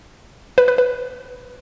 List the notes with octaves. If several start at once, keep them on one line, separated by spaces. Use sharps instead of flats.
B4
B4
B4